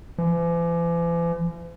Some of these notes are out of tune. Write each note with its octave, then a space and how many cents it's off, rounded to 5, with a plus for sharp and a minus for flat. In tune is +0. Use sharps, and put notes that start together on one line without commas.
E3 +45